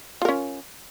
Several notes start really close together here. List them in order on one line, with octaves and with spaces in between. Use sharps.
F4 A#4 C#4